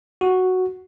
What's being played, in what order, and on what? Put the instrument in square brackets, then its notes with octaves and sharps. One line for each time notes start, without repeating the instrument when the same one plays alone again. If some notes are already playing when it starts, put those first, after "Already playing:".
[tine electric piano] F#4